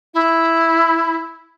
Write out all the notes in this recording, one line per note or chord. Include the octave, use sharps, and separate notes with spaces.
E4